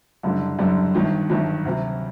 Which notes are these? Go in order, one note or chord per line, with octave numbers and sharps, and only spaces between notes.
F#1 F#2 D3 G3
F#1 F#2 D3 G3
G1 G2 D#3 F#3
G1 G2 D#3 F#3
D2 C3 F#3